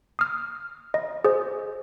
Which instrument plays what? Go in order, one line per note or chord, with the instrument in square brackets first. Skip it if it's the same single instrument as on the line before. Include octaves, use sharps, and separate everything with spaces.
[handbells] D#6 F6
D#5
G#4 C5